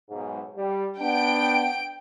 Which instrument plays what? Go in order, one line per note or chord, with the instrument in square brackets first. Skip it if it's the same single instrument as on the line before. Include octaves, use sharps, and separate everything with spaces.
[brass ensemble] B1 G#2
G3
[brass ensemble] B3 D4 [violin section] G5 D7